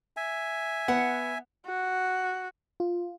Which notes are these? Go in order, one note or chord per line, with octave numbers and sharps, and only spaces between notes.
E5 G#5
B3 F#5
F#4
F4